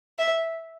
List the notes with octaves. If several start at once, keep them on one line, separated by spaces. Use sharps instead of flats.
E5